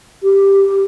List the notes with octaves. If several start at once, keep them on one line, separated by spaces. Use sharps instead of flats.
G4